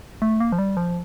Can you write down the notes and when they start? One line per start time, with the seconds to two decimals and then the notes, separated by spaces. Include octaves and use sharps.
0.22 A3
0.40 A#3
0.52 F3
0.58 G3
0.77 F3